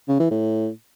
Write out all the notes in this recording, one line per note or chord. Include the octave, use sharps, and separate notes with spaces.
C#3
E3
A2